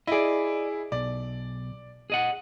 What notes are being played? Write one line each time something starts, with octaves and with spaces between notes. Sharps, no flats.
E4 G#4 D5 D#5
B1 D5
G#4 D#5 F#5